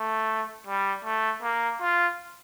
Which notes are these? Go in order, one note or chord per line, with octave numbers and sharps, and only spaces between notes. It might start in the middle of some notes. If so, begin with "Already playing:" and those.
Already playing: A3
G3
A3
A#3
F4